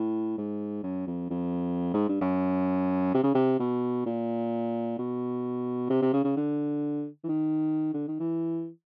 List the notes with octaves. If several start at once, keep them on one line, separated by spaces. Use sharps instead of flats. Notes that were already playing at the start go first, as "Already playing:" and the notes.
Already playing: A2
G#2
F#2
F2
F2
G#2
G2
F#2
C3
C#3
C3
B2
A#2
B2
C3
C3
C#3
C#3
D3
E3
D#3
D3
D#3
E3